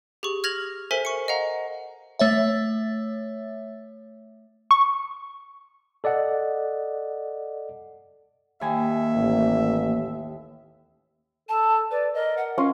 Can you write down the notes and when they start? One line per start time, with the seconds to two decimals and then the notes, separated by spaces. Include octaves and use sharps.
0.23 G4 G#4 C#6
0.44 F6 G#6 A#6 F7 F#7
0.91 A4 A#4 C5 E5 G#5 B6
1.05 C#6 C#7
1.28 D#5 F5 F#5 A#5
2.19 A3 C#5 E5
4.71 C#6
6.04 A4 D5 D#5 F#5
8.61 D#2 A#3 E5 G#5
9.16 A1
11.49 A4 A5
11.91 B4 D5
12.14 A#4 D#5
12.37 F#5
12.58 C#4 F4